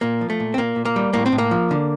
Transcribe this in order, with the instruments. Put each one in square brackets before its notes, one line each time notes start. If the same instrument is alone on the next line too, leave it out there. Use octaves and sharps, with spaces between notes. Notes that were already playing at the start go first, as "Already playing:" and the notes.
[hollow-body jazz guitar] A#2 A#3
F3
A3
A#2
C4
A#2 A#3
A#2
A#3
G3
A2 A#3
C4
A2
A#3
F3
D3